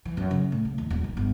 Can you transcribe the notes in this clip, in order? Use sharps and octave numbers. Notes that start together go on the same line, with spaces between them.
E3
F#2
C#3
A2
C#3
D#2
D#1
D#3
G1